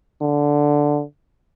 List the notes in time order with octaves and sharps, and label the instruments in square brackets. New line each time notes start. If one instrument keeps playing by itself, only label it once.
[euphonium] D3